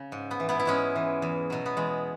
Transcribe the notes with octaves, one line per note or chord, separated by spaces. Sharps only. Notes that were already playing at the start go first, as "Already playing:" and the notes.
Already playing: C#3
G#2
B3
E3
B3 E4
E4
G#2 G#3 C#4
E3
E2
B2 F#3
B3
E2 G#3